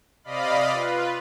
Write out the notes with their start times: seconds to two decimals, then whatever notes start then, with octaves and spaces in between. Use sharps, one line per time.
0.24 C3 D5 D#5 F5 B5
0.72 F4 B4